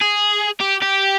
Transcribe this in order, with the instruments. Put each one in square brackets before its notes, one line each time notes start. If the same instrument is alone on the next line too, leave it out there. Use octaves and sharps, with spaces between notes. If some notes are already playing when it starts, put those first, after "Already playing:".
[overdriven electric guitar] G#4
G4
G4